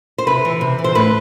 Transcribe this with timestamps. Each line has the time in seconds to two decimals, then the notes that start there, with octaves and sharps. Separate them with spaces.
0.18 C5
0.27 C3 B4
0.45 E3
0.61 C3
0.79 E3
0.84 C5
0.95 A2 B4